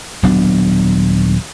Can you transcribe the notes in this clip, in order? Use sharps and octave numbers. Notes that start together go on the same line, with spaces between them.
D#1 F#3 B3 D4